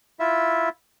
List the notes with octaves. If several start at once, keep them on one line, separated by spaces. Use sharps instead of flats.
E4 F4 E5